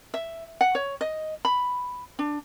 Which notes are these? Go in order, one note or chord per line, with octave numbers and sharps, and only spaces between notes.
E5
F#5
C#5
D#5
B5
D4